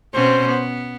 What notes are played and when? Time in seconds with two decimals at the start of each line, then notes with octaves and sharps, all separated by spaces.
0.14 B2 C4 C#4 C5
0.48 B3